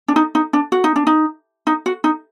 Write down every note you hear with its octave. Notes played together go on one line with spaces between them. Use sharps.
D4
D#4
D#4
D4
F#4
D#4
D4
D#4
D#4
F#4
D#4